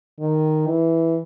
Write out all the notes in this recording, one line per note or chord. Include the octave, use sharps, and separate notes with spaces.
D#3
E3